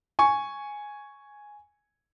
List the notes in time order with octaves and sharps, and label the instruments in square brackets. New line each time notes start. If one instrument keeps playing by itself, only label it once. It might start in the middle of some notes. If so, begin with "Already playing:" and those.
[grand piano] G#5 C#6